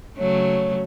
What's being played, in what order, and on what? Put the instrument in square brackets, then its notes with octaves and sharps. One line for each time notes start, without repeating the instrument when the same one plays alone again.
[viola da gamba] C#3 F#3 A3 [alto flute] C#5